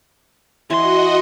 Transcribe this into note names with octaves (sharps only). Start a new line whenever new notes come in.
E3 F#4 C#5 D#5 C6